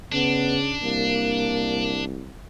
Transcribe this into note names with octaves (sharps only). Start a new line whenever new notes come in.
C#3 B3 D4
C2 A#3